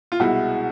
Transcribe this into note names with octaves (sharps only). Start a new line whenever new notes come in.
F4
C2 B2 G#3 E4 F#4